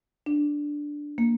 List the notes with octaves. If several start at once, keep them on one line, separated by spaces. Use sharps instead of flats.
D4
A#3